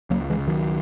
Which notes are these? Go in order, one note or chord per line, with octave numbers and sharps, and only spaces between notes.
C#2 F#3 A#3
E3 G#3
C#3
D#3 F#3